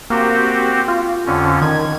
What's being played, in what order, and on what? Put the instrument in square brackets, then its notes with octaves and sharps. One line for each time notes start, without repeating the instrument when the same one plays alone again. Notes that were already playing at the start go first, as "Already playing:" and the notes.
[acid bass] A#3 [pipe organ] C4 F#4 G4
[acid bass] F4
[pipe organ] F2 D3 C#4
[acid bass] D#3 [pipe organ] G#6